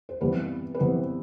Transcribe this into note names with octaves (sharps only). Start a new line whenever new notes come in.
C5
C3 E3 G3 B3 B4
B4
C3 E3 G3 B3 C5